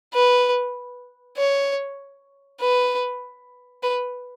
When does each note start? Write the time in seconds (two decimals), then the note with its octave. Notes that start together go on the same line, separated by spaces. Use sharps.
0.13 B4
1.37 C#5
2.60 B4
3.83 B4